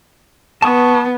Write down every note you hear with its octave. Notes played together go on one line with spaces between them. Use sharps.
B3 A5 C#6 D#6